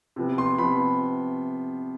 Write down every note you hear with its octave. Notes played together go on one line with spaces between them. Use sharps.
C3 F3 B3
C6
C3 F3 B3 B5